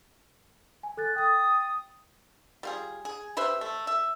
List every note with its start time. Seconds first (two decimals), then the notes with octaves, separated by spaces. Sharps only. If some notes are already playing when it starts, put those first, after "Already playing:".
0.83 G#5
0.97 A4 F#6 A6
1.16 G5 D#6 A6
2.63 G3 F4 G#4
3.05 G#4
3.37 G4 B4 C5 E5
3.61 A3
3.87 E5